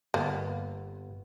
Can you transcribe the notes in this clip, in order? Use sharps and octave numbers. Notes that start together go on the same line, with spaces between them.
G1 A#3 B3